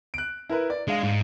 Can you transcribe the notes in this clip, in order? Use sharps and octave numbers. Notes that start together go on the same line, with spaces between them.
F#6 D7
E4 A#4 B4
D5
G#3 D4 F5
G#2